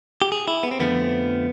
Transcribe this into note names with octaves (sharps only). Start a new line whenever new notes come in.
G4
G#4
E4
B3
C4
F2 D3 F3 A3 B3